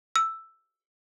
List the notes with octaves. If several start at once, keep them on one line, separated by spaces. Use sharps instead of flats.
E6